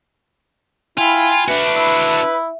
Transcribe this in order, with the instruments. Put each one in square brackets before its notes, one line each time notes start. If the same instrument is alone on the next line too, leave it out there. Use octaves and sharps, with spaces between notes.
[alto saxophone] E4 [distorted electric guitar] F4 [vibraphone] G5 B5 [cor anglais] G#5
[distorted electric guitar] D4 F#4 [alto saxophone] B4 [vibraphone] E5
[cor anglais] E4